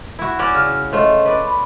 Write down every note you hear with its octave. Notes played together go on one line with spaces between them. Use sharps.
E4 F#4
C#4 F#4 D5
C#3 F6
A3 F4 C5 C#5 D#5
B4 D5
B5